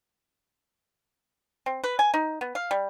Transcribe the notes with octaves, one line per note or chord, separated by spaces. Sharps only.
C4
B4
G#5
D#4
B3
F5
G3